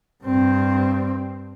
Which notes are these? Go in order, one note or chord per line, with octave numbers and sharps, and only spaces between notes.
G2 C4